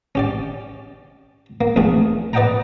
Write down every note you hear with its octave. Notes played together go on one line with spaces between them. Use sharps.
C#4 G4 D5
A#3
A#1 E2 A3 G#4
B4 D5 D#5 F#5 G5 A#5